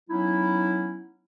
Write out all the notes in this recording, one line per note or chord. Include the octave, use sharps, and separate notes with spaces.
F#3 B3 C#4 D#4 E4